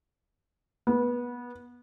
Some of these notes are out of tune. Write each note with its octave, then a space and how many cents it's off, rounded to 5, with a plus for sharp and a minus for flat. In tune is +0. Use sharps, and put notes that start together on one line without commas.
B3 -20